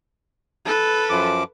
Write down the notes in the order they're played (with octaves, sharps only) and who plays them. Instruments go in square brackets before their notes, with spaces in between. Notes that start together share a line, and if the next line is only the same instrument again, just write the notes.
[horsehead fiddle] A4 B4
[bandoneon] F#2 F3 D6